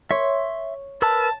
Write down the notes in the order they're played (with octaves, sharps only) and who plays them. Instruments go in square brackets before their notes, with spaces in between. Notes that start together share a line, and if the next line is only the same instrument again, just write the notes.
[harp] C#5 [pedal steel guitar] E5 C6
[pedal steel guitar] A#4 B4 E6 [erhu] A5